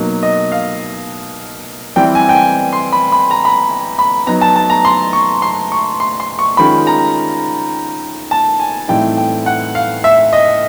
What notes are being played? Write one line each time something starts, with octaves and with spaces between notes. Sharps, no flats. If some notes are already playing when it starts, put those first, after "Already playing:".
Already playing: B2 F#3 A#3 D#4
D#5
F5
E3 G3 C4 G5
G#5
G5
G#5
C6
B5
B5
A#5
B5
A#5
B5
F#3 B3 D#4 A#5
A5
A5
A#5
C6
C#6
C6
C#6
C6
C6
C#6
D#3 G#3 C#4 F4 B5
A#5
A5
G#5
A2 E3 G3 C4 D#4 G5
G5
F#5
F5
E5
D#5